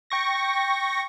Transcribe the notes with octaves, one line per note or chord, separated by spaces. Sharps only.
G5 C#6 A#6